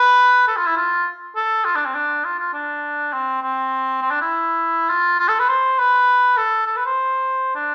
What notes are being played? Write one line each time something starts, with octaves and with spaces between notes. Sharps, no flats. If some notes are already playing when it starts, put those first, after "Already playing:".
Already playing: B4
A4
F4
E4
F4
A4
F4
D4
C4
D4
F4
F4
D4
C4
C4
C4
D4
E4
F4
F4
A4
B4
C5
B4
A4
A4
B4
C5
D4